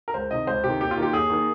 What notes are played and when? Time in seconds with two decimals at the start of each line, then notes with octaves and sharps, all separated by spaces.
0.08 A#4
0.14 C#2 C5
0.31 C3 D#3 D#5
0.47 C#2 C5
0.64 C3 D#3 G4
0.80 D#2 G4
0.91 F4
0.97 D#3 A#3 G4
1.13 D#2 G#4
1.30 D#3 A#3